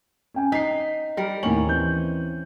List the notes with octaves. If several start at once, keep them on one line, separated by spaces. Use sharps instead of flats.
C#4 G5 G#5
D#4 B6 C7
G3 A#4
D#2 A2 C#4 F#7
E3 C4 G6